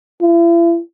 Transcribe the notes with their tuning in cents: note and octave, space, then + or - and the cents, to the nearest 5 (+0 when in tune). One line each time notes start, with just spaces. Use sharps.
E4 +45